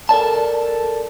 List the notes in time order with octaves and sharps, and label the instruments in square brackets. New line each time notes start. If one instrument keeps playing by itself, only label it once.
[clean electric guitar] A4 A#4 D5 A5